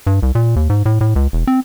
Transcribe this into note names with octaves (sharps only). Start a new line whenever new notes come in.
G2
C2
A#2
D#2
G#2
A2
A2
C#2
E1
C4